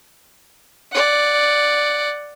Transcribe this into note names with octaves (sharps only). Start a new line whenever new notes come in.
D5 F#5